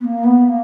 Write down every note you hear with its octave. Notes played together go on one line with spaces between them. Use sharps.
B3
A#3
B3
A#3